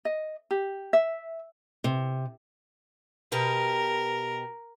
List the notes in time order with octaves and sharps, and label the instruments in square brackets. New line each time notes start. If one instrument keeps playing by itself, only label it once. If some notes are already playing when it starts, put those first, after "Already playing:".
[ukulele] D#5
G4
E5
[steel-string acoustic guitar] C3
[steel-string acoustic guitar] B2 G4 B4 [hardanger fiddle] A#4